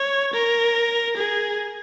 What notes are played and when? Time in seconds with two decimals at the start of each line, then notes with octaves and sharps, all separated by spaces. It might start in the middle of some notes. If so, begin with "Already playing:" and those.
Already playing: C#5
0.34 A#4
1.17 G#4